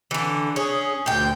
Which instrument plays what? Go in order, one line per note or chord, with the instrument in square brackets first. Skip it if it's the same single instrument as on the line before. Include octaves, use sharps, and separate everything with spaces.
[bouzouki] D3 E3
[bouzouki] C#4 [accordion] G#4
[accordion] D2 G6 [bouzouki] A#2 G5